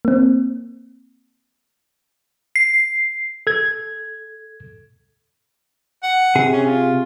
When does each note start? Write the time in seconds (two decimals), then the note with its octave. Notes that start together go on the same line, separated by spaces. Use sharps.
0.05 A#3 C4
2.56 C7
3.47 A4 G#6
6.03 F#5
6.35 C3 G#4
6.52 C#4
6.66 F4